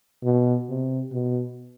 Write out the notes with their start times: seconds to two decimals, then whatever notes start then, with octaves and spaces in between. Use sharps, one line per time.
0.24 B2
0.69 C3
1.12 B2